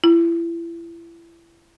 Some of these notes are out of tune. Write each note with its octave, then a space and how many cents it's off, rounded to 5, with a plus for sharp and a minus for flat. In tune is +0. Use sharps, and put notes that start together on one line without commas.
E4 +30